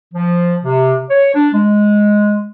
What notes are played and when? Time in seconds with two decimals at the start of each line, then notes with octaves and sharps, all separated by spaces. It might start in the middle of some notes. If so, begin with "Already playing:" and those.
0.14 F3
0.64 C3
1.09 C#5
1.34 D4
1.54 G#3